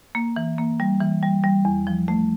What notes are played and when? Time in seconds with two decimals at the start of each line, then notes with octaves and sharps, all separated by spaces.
0.15 A#3
0.36 E3
0.58 A#3
0.80 G3
1.01 E3
1.23 G3
1.44 G3
1.65 E2
1.87 F3
2.08 A3